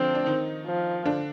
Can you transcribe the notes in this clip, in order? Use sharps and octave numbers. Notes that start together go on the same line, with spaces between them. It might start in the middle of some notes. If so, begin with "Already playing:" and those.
Already playing: D3 F3 C4 D4 F4
D4
D#3 D#4
F3
D3 D4